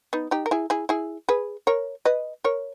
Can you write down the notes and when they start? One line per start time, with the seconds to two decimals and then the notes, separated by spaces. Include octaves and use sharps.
0.13 B3 D#4
0.31 D#4 G4
0.46 A#4
0.51 E4 G#4
0.70 E4 G#4
0.89 E4 G#4
1.29 G#4 B4
1.67 A#4 C#5
2.05 B4 D#5
2.44 A#4 C#5